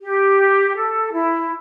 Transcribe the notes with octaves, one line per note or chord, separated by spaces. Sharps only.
G4
A4
E4